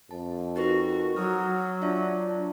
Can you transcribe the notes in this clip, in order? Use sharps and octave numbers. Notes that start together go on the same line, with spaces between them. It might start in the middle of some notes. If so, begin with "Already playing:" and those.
F2 A5
D#4 F#4 A#4 B4
F#3 A#5 D#6 F6
D4 F4 E5 C#6